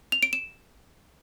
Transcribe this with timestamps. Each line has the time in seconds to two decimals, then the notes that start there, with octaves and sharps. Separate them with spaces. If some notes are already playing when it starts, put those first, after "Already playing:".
0.12 F7
0.23 D7
0.33 E7